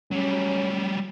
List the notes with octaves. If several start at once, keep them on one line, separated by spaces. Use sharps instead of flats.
F#3 G3 C#4